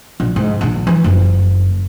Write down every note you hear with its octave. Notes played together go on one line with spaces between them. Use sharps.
A#1
G#2
A#1 D#3
E3 F#3
F#1